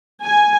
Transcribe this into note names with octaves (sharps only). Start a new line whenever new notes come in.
G#5